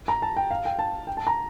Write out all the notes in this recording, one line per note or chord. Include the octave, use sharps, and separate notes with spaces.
A#5
A5
G5
F5
G5
A5
G5
A5
A#5